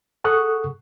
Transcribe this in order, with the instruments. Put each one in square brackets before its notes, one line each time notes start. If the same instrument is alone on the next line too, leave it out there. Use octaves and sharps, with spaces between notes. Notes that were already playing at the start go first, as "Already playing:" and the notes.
[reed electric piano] G#4 A4 F#5 C#6 D#6 F#6